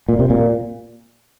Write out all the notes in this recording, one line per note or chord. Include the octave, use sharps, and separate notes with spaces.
A#2
C3
A#2